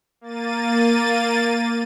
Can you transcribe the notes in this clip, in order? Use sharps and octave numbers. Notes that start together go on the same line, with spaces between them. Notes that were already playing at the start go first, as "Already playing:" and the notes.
A#3 A6 D#7